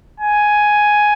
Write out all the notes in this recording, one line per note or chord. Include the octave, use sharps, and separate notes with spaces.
G#5